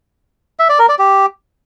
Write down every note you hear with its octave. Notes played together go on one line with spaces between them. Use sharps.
E5
D5
A#4
D5
G4